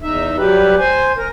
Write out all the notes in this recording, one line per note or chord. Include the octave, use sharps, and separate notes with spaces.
E2 D#4 E5
F#3 G3 G4 B4
C5 G#5
A#4